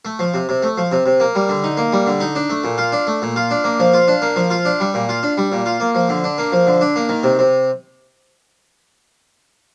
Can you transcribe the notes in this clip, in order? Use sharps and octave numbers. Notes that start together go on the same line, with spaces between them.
A3
F3
C3
C3
A3
F3
C3
C3
A#3
G3
D3
D#4
A#3
G3
D3
D#4
D4
A3
A#2
F4
D4
A3
A#2
F4
D4
A#3
F3
F4
D4
A#3
F3
F4
D4
G3
A#2
F4
D4
G3
A#2
F4
A#3
F3
D3
D4
A#3
F3
D3
D4
A#3
D#3
C3
C3